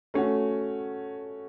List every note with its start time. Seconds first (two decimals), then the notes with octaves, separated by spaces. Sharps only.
0.14 A3 C#4 F#4